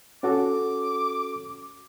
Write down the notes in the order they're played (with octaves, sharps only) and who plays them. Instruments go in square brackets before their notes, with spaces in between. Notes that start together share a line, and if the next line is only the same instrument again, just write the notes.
[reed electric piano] C#4 F#4 A4 [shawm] D6